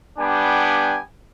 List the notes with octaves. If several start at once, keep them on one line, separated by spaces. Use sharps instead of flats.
G3 B3 D4 G5 G#5